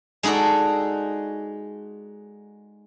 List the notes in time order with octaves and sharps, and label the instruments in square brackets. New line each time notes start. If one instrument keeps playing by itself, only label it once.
[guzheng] G#3 D#4 F#4 A4 D5